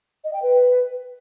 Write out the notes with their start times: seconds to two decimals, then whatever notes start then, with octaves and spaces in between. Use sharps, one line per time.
0.24 D#5
0.33 G5
0.43 B4